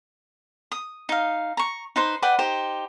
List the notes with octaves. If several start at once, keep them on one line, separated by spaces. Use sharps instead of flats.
D#6
D#4 F5
A#5 C#6
D#4 B4 C5
B4 D5 F#5 G5
D#4 G4 C5